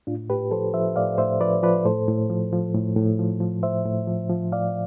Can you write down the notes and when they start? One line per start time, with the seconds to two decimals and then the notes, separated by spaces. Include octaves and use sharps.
0.07 A2 D4 F4
0.30 A2 G4 B4
0.51 F3 A4 C5
0.74 F3 C5 E5
0.96 A2 D5 F5
1.18 A2 C5 E5
1.40 F3 B4 D5
1.63 F3 B4 D5
1.85 A2 A4 C5
2.08 A2
2.30 F3
2.53 F3
2.74 A2
2.96 A2
3.19 F3
3.40 F3
3.63 A2 C5 E5
3.86 A2
4.07 F3
4.29 F3
4.52 A2 D5 F5